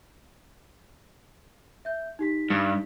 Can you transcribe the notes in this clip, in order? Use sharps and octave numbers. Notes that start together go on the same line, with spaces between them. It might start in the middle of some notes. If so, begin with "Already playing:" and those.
E5 G6
D#4 G4 B6
G2